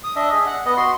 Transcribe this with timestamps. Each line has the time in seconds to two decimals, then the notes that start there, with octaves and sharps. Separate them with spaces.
0.04 D#6
0.16 D4 D#5 E5
0.33 G#4
0.46 F#5
0.66 B3 D#5
0.77 F#4 C6